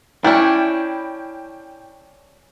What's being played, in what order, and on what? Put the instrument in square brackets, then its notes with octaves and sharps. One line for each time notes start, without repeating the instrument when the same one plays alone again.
[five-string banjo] C#4 D4 [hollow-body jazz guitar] E4 [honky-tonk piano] G5